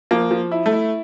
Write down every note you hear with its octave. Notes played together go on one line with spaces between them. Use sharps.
F3 A#3
F3
E4
A3
E4